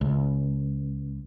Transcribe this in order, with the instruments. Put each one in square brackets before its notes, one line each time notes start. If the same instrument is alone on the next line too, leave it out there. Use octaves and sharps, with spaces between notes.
[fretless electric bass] C#2